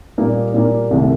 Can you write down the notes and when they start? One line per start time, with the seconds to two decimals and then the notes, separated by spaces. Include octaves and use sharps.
0.18 A#2 G3 A#3 D#4
0.54 A#2 G3 A#3 D#4
0.91 C2 C3 D#3 A3